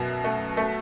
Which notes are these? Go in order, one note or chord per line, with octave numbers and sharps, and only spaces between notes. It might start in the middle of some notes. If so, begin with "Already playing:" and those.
Already playing: F#2 B2 E5
A3
A3 E5